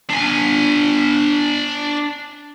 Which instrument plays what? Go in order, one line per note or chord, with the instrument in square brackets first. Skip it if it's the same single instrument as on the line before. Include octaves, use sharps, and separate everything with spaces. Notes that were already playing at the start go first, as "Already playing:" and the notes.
[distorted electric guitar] D4 G#5